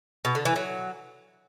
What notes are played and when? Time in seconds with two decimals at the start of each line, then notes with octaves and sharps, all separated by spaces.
0.25 B2
0.35 D3
0.45 E3
0.56 F#3